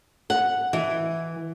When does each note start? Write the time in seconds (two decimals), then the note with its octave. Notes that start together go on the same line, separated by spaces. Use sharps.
0.30 F#5
0.73 E3